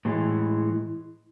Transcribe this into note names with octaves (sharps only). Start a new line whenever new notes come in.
A2 E3 G#3